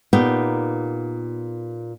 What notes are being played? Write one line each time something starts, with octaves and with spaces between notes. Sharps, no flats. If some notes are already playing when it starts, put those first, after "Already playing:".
A#2 B3 D#4 G4